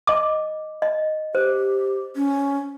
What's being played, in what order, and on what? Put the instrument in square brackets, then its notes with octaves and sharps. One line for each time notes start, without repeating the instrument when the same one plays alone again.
[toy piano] D#5 D6
D#5
[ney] G4 [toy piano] C5
[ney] C#4